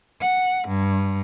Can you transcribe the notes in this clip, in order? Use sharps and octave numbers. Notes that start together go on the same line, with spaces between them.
F#5
G2